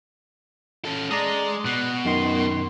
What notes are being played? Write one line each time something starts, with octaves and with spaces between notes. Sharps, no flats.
C#4 A4
G#3 D5 A#5 D#6
B2 F#6
F#2 D#3 C6